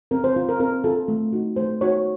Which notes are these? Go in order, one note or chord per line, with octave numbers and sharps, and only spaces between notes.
C4 A#4
C5
F4 C5
A#4
C4 A#4
F4 A4
A3
D#4 F#4
A3 C5
D#4 F#4 C#5